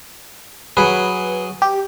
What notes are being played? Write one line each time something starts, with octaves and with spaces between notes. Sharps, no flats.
F#3 G#4 B4
G4